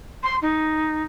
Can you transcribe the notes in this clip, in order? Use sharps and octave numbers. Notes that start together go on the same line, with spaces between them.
C6
D#4